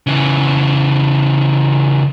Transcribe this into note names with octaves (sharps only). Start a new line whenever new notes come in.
C#3 E3